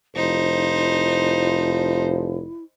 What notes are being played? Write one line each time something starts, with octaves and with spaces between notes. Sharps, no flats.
F1 F3 D#4 E4 C5